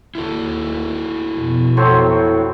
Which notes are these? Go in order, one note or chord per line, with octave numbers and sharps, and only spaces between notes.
D#2 E4 F#4 A4
F2 B2
A2 F#3 C4 C#5